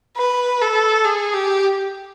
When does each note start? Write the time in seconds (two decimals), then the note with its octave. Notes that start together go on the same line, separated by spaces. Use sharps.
0.17 B4
0.61 A4
1.04 G#4
1.34 G4